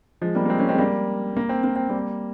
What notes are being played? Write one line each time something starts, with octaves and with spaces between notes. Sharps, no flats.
F3 G#3
G3 A#3
A#3
G#3 C4
A#3 C#4
G#3 C4
G3 A#3
A#3
C4
A#3
C4
G3 A#3